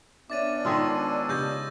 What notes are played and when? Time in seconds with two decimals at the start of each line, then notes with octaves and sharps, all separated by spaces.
0.30 B3 C#4 D4 D5 E5 D6 A6 D#7
0.65 D#3 G#3 F4 A5 C#6 E6
1.29 C#3 G4 D#5 C#6 G6 A#6